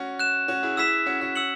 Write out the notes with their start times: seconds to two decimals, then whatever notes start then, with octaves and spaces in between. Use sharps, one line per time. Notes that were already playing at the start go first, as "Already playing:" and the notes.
Already playing: C#4 F#4
0.19 F#6 E7
0.48 C#4 F#4
0.63 E4 G#4
0.77 E4 G#4 E6 B6 E7
1.06 C#4 F#4
1.21 C#4 F#4
1.36 E6 C#7 F#7